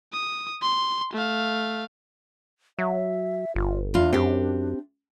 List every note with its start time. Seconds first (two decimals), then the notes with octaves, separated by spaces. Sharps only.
0.13 D#6
0.62 C6
1.13 A3 F5
2.79 F#3 E5
3.55 G1 F4
3.94 E2 D4 F4
4.13 F#2 C4 G4